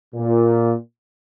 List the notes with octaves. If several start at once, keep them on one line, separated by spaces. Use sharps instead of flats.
A#2